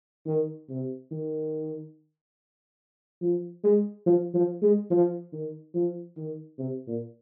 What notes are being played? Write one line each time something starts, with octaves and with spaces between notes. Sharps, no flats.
D#3
C3
D#3
F3
G#3
F3
F3
G#3
F3
D#3
F3
D#3
C3
A#2